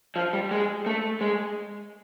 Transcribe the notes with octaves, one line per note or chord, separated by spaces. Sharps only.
F3
G3
G#3
A3
G#3